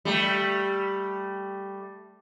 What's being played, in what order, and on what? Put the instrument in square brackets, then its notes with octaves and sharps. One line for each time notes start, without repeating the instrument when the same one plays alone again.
[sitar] G3 A3